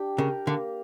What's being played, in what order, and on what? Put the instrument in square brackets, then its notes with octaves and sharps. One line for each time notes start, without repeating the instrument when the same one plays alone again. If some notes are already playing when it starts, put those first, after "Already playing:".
Already playing: [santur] D4 G4
[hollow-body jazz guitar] C#3 [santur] A#4
[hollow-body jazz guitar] D3 [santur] A#3